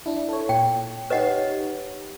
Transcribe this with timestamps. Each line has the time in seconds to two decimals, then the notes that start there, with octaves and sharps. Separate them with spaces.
0.06 D4 E4
0.29 A4 C#5
0.49 A#2 G5
1.10 D#4 G4 B4 C#5 D#5 F#5